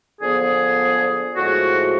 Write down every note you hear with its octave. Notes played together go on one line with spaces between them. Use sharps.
D3 F3 B3 G#4
A2 F3 G#3 F#4